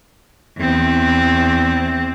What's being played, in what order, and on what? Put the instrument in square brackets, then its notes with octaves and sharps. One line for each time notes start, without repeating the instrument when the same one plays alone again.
[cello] E2 C4